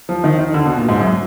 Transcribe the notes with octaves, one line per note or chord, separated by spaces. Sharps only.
F3
D#3
D#3
D3
B2
A#2
G#2
F#2